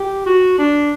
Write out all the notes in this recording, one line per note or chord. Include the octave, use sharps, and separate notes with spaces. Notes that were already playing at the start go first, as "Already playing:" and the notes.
Already playing: G4
F#4
D4